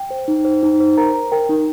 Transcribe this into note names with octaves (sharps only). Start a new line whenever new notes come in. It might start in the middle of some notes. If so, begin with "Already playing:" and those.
Already playing: G5
C5
D#4
C5
D#4
C5
A#4 A#5
A#4
A#4 G5
D#4